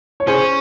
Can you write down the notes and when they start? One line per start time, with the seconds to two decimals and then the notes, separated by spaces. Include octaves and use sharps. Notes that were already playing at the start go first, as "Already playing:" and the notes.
0.20 C#5
0.27 C#4 G#4 C5